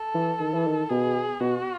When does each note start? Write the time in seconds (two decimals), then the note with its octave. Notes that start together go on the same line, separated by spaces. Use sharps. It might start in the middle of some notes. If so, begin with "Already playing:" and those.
Already playing: A4
0.14 E3
0.40 D#3
0.54 E3
0.67 D#3
0.90 B2 G#4
1.40 B2 F#4